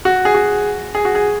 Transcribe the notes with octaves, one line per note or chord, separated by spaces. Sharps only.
F#4
G#4
F#4
G#4
F#4
G#4